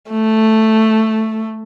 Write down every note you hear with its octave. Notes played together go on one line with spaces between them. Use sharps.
A3